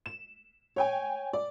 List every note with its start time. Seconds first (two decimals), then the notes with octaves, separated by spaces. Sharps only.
0.06 E7
0.76 C#5 G5 G#5
1.33 D5